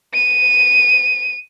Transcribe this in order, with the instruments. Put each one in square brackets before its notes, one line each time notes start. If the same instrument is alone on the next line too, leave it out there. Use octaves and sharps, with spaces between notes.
[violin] D#7